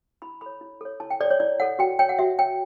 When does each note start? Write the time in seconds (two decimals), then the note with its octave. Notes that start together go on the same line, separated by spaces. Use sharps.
0.22 E4 B5
0.41 A4 C#5 B5
0.61 E4
0.81 A4 C#5
1.00 E4 A5
1.10 G5
1.20 A4 C#5 D5
1.30 C#5
1.40 E4 D5
1.60 A4 C#5 F#5
1.79 F#4 G5
1.99 C#5 G5
2.09 F#5
2.19 F#4 E5
2.38 C#5 G5